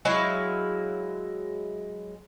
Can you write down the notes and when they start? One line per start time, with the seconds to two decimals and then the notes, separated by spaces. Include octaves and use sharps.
0.05 F#3 G#3 E4 F5